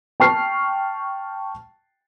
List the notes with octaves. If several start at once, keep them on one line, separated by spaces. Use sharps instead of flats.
G5 A5 C#6 F6 C7